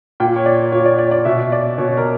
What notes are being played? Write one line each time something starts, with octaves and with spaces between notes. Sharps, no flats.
A#2 G5
C#5
D5
A#2 C#5
D5
D5
D5
B2 E5
D5
B2 C#5
A#4